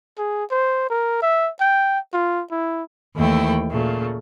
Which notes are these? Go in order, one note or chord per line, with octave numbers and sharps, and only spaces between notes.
G#4
C5
A#4
E5
G5
F4
E4
D#2 D#3 E3 A3 E4 G5
A#2 C#3 A3